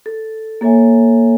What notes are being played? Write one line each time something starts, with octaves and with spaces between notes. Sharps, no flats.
A4
A#3 A4 C#5 E5 G#5